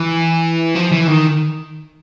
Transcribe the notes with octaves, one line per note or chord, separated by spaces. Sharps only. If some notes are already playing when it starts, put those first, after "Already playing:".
Already playing: E3
F3
E3
D#3